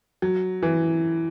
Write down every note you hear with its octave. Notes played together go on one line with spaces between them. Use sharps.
F#3
E3